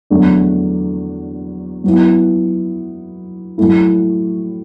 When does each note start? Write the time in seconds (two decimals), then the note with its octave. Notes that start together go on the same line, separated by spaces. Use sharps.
0.10 E2 D3 F#3 A3 D4
1.84 F#3 B3 E4
3.58 A2 F#3 A3 E4